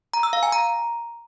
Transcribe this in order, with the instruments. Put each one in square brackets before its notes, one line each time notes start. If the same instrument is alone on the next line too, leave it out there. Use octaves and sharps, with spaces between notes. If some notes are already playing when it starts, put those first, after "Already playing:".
[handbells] A#5
E6
F5
G#5
A#5